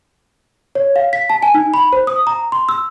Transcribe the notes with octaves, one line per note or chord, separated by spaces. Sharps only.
C#5
F5
B6
A5
G#5
D#4
B5
C5
D#6
A#5
C6
E6